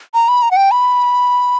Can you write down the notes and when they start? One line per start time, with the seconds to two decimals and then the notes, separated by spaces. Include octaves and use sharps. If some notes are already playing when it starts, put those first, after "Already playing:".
0.14 A#5
0.28 B5
0.42 A#5
0.51 F#5
0.57 G5
0.71 B5